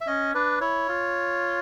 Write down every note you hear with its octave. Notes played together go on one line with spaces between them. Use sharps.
E5
C#4 D#5
D4 B4
E4 C#5
F4